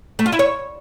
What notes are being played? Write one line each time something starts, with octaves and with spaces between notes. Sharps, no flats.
A3
F4
E4
C#5